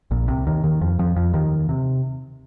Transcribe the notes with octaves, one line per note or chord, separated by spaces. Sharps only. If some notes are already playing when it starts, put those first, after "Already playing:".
A#1 A#2
C2 C3
D#2 D#3
D#2 D#3
F2 F3
F2 F3
F2 F3
D#2 D#3
C3